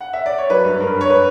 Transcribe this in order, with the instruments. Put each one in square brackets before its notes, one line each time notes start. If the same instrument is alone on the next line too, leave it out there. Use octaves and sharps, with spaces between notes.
[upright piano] F#5
E5
D5
C#5
F#3 B4
G2
G2 A#4
G2
C#5
B4